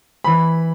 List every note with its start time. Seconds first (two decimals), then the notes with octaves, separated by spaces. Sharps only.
0.24 E3 B5